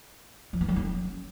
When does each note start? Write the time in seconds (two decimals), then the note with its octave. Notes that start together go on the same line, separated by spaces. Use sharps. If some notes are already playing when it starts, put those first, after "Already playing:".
0.53 F3
0.61 B3
0.68 F#3
0.76 C#4